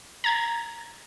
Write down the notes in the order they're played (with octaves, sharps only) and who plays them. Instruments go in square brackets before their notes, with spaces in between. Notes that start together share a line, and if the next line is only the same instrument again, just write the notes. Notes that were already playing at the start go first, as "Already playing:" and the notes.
[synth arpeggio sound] A#5 G#6 A6